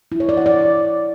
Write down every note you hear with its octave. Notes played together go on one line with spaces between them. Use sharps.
E4
C#5
D5
F#5
D5